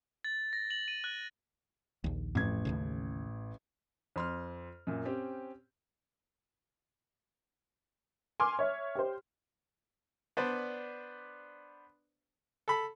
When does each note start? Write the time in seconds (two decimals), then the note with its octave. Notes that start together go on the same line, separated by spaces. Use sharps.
0.24 A6
0.53 A#6
0.70 F#7
0.88 D#7
1.04 F#6
2.04 A#1 D#2
2.35 A1 F2 G#6
2.65 D#2 A2 C#3
4.16 F2 C6 F6
4.87 F#2 A#2
5.05 C4 C#4 G4
8.40 G#5 C6 D6 F6
8.59 C#5 E5
8.95 G4 C5
10.37 B3 D4 B4 C5 D5
12.68 A4 B5